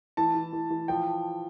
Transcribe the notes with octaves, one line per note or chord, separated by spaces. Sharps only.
E3 A5
E3
E3
E3
F3 G5